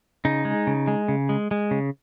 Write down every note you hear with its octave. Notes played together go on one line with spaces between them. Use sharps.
C#3 D#4
G#3
C#3
G#3
C#3
G#3
G#3
C#3